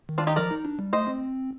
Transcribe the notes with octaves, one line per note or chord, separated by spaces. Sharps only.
D#3
D4 F4
D#4 G4
F3 A#4 D5
D#4
D4
G3
A3 C5 D#5
C4